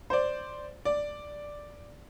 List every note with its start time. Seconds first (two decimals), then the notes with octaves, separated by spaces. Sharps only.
0.10 C5 D5
0.85 D5